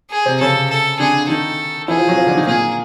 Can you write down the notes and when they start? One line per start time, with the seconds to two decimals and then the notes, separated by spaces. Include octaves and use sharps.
0.11 G#4
0.26 C3 C4
0.41 C#3 C#4 A4
0.70 A4
0.99 D3 D4 G#4
1.28 D#3 D#4 A4
1.88 E3 E4 G#4
1.97 F3 F4
2.08 F#3 F#4
2.17 F3 F4
2.27 D3 D4
2.37 D#3 D#4
2.47 A#2 A#3 G#4